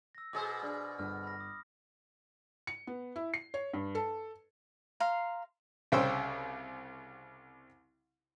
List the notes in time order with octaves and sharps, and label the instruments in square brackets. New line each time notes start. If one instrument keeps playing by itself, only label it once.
[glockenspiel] E6 A#6
[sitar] B2 G#4 C5 [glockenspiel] D6
[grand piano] D4 [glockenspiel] F6
[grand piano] G1 [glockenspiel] F6
[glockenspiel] B5 A#6
D#6
[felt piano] C#7
B3
E4
C7
C#5
G2
A4
[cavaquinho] F5 A#5 C6
[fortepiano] C2 C#3 C5 G5 C6 E6